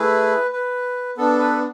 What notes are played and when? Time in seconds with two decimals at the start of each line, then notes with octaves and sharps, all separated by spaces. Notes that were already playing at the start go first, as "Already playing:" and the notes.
Already playing: A3 E4 G#4 B4
0.53 B4
1.17 B3 D4 A4
1.39 B4